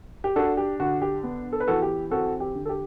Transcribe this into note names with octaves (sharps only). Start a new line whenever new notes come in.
G4
D4 F#4 A4
G4
D3 F#4
G4
B3
A4
B4
E3 F#4 A4
G4
C4 F#4 A4
G4
D3
A4
G4